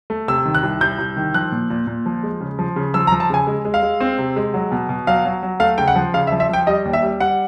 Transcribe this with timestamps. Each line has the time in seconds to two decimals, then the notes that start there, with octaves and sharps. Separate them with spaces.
0.10 A3
0.28 C3 E6
0.45 D#3
0.55 F#6
0.63 C2
0.81 C2 G6
0.99 C2
1.17 D#3
1.34 F3 F#6
1.52 A#2
1.70 A#2
1.87 A#2
2.06 F3
2.23 G#3
2.41 C#3
2.59 F3
2.76 C#3
2.94 F3 E6
3.07 A#5
3.12 F3
3.20 A5
3.30 C#3 G#5
3.47 G#3
3.65 G#3
3.74 F5
3.82 G#3
4.00 C4
4.18 C3
4.36 G#3
4.54 F#3
4.72 B2
4.89 B2
5.07 F#3 F5
5.25 F#3
5.43 F#3
5.60 A3 F5
5.78 C#3 G5
5.88 F#5
5.96 F3
6.14 C#3 F5
6.27 E5
6.32 F3
6.40 E5
6.49 F3 G5
6.67 G3 D#5
6.85 D#2
6.93 E5
7.03 G3
7.20 G3 F#5